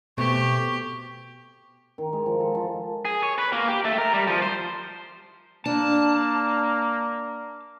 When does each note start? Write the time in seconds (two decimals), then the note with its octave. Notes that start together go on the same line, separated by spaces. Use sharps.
0.18 B2 A3 C4 G4 C#6
1.98 D#3
2.13 G#3
2.26 F3
2.40 A4
2.55 F3
3.05 G#4
3.23 C#5
3.38 B4
3.53 A#3
3.68 G4
3.85 A3
3.98 A#4
4.14 G3
4.27 F3
4.42 C5
5.66 A#3 D4 A5